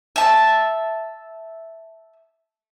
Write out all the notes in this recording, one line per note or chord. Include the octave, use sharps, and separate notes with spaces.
E5 A5